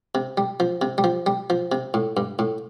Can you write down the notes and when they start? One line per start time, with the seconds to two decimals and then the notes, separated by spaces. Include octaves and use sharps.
0.15 C3
0.37 G3
0.60 F3
0.82 C3
0.98 G3
1.04 F3
1.26 G3
1.50 F3
1.72 C3
1.94 A2
2.17 G2
2.39 A2